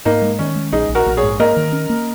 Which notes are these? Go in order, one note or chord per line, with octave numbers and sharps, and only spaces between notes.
G#2 A#3 D#4
G#3
D#3 C#4
G#3
A#1 D#4 G#4
A#1
F#4 A#4
A#1
G#4 C#5
G#2
A#3 A#4 D#5
D#3
C#4
A#3